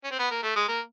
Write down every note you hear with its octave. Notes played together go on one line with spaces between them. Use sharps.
C#4
C4
B3
A#3
A3
G#3
A#3